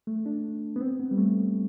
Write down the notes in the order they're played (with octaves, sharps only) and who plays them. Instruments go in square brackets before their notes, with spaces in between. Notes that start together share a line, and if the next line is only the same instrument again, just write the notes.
[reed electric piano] A3
D4
B3
C4
B3
G3
A3